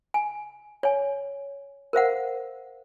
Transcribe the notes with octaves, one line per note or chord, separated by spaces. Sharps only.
G#5
C#5 G#5
A#4 C5 F5 F#5